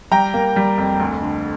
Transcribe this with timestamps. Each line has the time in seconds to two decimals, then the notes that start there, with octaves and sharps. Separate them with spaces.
0.11 G3 G5 A#5
0.34 A#3
0.56 G3
0.78 F2
1.00 D2
1.22 D3